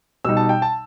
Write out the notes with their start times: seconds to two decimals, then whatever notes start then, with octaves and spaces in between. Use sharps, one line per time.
0.25 B2 G3 D#4 E6
0.37 A5
0.49 G5
0.62 A5